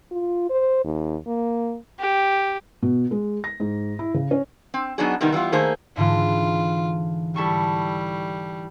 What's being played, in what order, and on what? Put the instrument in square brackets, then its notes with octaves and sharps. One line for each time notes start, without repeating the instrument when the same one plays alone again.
[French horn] F4
C5
D#2
A#3
[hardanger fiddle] G4
[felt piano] B2
G#3
A#6
G#2
E4
C#3
C#4
[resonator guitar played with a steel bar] C4
F#3 B3 D4 D#4 F#4 G#4
C3 D#3 G3 B3 D#4
E3 G3 B3 F4
D#3 A3 A#3 G#4 C5
[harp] G#2 D3 E3 [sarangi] F4
[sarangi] G3 [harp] E4 A4 C#6